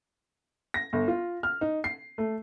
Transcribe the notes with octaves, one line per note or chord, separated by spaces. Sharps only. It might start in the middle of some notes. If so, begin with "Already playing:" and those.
A#6
G1
F4
F6
D#4
C7
A3